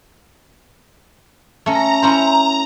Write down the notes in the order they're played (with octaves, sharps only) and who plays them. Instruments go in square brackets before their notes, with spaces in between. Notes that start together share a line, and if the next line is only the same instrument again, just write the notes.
[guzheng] A3 C#4 [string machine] A#5
[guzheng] C#4 E4 C5